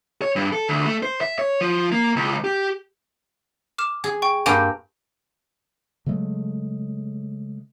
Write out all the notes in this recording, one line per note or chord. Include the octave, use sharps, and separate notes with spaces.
C#5
G2
A4
D2
A3
C5
E5
C#5
F3
A#3
C#2
G4
D6 F6 E7
G#4
G5 C#6
G2 A#3 G4 G#5 D7 F7
C#3 F#3 G#3 A3